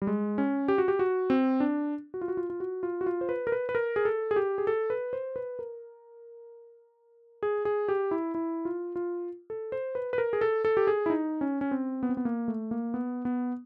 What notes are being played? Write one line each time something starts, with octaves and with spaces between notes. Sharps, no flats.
G3
G#3
C#4
G4
F#4
G4
F#4
C4
D4
F#4
F4
F#4
F4
F4
F#4
F4
F#4
F4
C5
B4
A#4
B4
B4
A#4
G#4
A4
G#4
G4
G#4
A4
B4
C5
B4
A#4
G#4
G#4
G4
E4
E4
F4
F4
A4
C5
B4
B4
A#4
G#4
A4
A4
G4
G#4
E4
D#4
C#4
C#4
C4
B3
C4
B3
A#3
A3
A#3
B3
B3